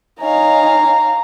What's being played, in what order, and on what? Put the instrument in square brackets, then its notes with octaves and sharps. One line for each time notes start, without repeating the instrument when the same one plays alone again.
[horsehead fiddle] D#4 G#5 [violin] C#5 F5 [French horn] D#5 [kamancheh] A#5